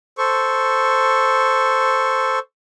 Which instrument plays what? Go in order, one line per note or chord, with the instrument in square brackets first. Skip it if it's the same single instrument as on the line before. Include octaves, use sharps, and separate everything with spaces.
[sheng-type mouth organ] A4 C5 C#6